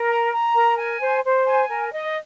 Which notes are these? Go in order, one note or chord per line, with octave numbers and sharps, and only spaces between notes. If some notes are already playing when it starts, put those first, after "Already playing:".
Already playing: A#4
A#5
A#5
A#4
G#5
C5
C5
G#5
A#4
D#5